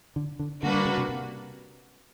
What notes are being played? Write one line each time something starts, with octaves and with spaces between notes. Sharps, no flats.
D3
D3
D3 G3 A#3 D4 F#4 B4
D3
C#3
C3
C3